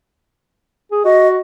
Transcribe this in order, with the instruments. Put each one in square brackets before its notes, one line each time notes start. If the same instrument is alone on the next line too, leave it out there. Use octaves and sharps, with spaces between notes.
[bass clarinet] G#4
[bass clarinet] F#4 [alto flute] D#5